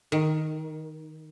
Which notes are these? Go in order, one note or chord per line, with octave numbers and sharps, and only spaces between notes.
D#3